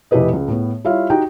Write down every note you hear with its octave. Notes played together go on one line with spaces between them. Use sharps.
F1 E4 G4 B4 D#5
C#2
A2 B3
G3 E4 F4 C#5 E5 F5
D#4 F#4 G4 G5